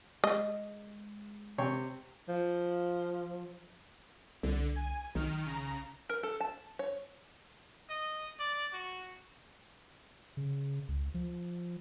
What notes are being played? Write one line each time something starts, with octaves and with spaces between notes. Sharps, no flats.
G#3 D#5
C3 C#5 G5
F3
C2 D3
G#5
B1 D#3 F6
C#3 A#5
A#4
A4
A5
C#5
D#5
D5
F#4
C#3
C#2
F3